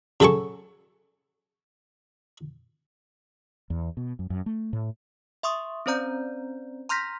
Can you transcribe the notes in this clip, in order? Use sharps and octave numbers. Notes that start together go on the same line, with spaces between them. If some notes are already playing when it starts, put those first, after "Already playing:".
C#3 F#3 A4 G#5 C#6
E2
B2
F#2
F#2
A3
A2
E5 C6 C#6 D#6
C4 C#4 C5 D5 A#5 G6
A#5 C6 F6 G6 A#6 B6